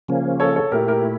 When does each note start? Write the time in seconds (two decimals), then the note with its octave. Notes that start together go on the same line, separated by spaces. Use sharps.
0.08 C#3 F3 A#3 C#4
0.40 A4 C#5
0.56 A4 C#5
0.72 A#2 A3 E4 G4 A#4
0.88 G4 A#4